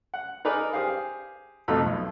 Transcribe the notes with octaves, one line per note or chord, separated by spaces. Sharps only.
F#5
D#4 G#4 A#4 B4 D5
G4 G#4 C5 F5
F2 B2 A3 D#4 B5
B1